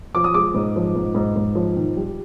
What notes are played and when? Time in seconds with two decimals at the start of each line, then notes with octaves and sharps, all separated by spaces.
0.15 F3 D6
0.24 D#6
0.34 G#3 D6
0.54 G#2
0.76 F3
0.96 G#2
1.15 G#2
1.36 G#2
1.55 F3
1.76 D#3
1.97 G3